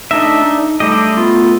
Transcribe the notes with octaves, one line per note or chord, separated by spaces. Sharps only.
A3 D4 D#4 D#5 E5
D#4
G3 A3 D4 G4 D#5
B3 F4